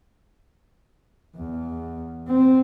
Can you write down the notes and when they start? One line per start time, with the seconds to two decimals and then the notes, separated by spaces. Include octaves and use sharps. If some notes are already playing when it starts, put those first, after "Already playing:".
1.36 E2
2.28 C4